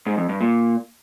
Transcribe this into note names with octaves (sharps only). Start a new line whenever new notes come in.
G#2
F2
G2
A#2